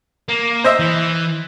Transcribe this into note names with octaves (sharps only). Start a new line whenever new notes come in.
A#3
C5 D#5 E5
E3